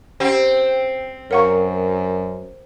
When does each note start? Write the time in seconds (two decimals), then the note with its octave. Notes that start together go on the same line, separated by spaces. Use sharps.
0.20 C4 C#4 G4 F#5
1.31 F#2 A#4 C#5 F5 F#5 A#5 C#6